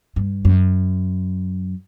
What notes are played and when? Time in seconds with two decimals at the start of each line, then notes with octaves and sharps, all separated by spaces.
0.16 G2
0.45 F#2